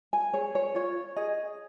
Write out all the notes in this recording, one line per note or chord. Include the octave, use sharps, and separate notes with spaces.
G#5
G#4 C#5
C#5
F4 C#5
G#4 D#5